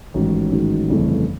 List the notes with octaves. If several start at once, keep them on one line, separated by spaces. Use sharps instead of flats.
A1 G#2 D#3 F#3
A1 G#2 D#3 F#3
G1 F2 C#3 E3 A3